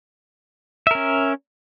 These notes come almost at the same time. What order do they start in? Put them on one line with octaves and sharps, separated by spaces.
E5 A#4 C#4